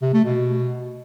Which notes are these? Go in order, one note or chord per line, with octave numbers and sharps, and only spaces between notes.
C3
A3
B2